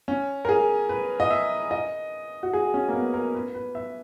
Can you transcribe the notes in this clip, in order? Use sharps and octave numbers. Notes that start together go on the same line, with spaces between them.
C#4
A#4
G#4
B4
D#5
E5
D#5
F#4
G#4
C#4
A#3
B3
A#4
B4
B4
E5